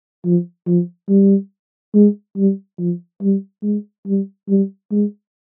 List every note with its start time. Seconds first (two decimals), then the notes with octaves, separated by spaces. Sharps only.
0.25 F3
0.67 F3
1.09 G3
1.94 G#3
2.37 G3
2.79 F3
3.21 G3
3.63 G#3
4.06 G3
4.49 G3
4.91 G#3